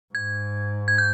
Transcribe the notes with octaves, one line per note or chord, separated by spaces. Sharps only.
G#2 G#6
G#6
G6